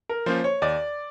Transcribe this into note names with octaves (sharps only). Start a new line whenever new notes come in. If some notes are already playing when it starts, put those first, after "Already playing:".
A#4
F3 A#3 C#4 F4 C5
C#5
D#2 D5